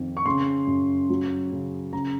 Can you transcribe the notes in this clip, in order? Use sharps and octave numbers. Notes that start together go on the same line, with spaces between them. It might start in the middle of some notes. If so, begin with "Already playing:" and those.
Already playing: F2 D#3
C#6
C#3 C6
F#2
F#3
C#3
C#3 A#5